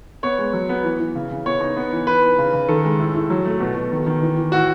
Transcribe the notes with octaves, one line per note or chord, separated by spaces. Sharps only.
B3 C#5
G#3
F#3
B3
E3
E3
C#3
C#3
B3 C#5
D#4
B3
E3
E3 B4
D#4
C#3
C#3
D#3 A4
G#3
A2
A2
F#3
A3
B2
B2
D#3
D#3
E3
E3
A2 F#4